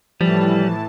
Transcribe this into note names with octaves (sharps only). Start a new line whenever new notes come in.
A2 E3 F3 G3 A5